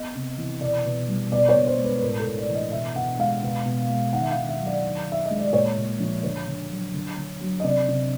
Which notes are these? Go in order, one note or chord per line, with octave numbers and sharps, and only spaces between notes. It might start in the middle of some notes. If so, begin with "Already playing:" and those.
Already playing: B3 D#5
C3
E3
B2 D5
B2
G3
B2 D5
C#5
B2
C5
G#3
B4
B4
A2 A#4
A4
A2
D5
E3
D#5
B2 E5
B2 F#5
G#3 F5
B2
B2
G#3
D#3 F#5
E5
F5
D#3
E5
F#3
D5
D#3
D#3 E5
G#3 D#5
D5
A#2 C#5
A#2
F3
D3 C#5
D3
F#3
D3
D3
F#3
D#5
C3 D5
C3